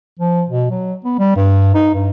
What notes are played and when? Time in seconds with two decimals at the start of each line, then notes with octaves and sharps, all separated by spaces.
0.19 F3
0.49 B2
0.70 F#3
1.04 B3
1.19 G3
1.36 G2
1.75 D#4
1.94 G2